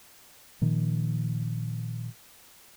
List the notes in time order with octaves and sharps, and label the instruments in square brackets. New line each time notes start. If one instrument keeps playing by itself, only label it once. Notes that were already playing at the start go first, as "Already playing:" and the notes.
[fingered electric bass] A#2 D#3 F3